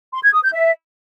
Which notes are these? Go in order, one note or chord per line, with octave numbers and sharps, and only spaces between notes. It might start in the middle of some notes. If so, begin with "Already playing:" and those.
C6
G#6
D#6
G6
E5